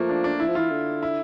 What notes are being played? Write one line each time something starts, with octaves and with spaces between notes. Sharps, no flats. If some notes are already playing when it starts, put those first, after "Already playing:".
Already playing: F3 A3 A#3
D4
D4
E3 E4
F3
E3 F4
D3
E4